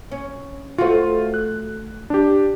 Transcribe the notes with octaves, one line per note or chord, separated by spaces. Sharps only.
C#4
A3 F4 F#4 C5
F#6
D4 G4